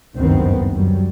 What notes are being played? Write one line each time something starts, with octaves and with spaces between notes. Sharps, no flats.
F#1 D2 G2 D#3 B3 C4
F#2 F#3 G3